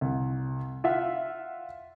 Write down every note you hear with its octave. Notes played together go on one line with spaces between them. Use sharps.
C2
F4 E5 F#5